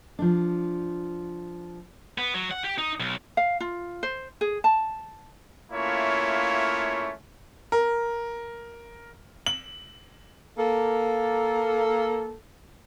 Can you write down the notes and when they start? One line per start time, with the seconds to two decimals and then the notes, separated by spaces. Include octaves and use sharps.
0.19 F3 D4
2.18 B3
2.34 F#3
2.51 F#5
2.64 G4
2.78 D#4
3.00 B1
3.37 F5
3.60 F4
4.03 C5
4.41 G#4
4.64 A5
5.72 A3 A#3 C#4 E4 F4 C#5
7.72 A#4
9.46 F#7
10.58 A#3 A4